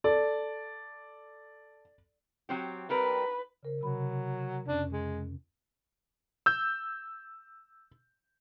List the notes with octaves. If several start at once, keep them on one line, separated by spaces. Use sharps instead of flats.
A4 D5
F#3 C4 G4
G3 C4 A#4 B4
C#3 A#4 C5
C3 F#3 B5
F2 C#4 D4
G#3
E6 G6